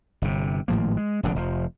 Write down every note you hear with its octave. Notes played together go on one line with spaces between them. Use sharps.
G1 C3
G#1 A2 F3 A#3
G#3
F1 A#1 A#2 D3
F1 F3